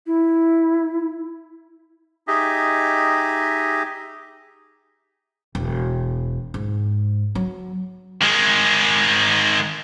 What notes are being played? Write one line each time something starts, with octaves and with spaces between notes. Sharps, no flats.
E4
D#4 G4 G#4 D#5 E5
E1
G#2
F#3
D#3 G#3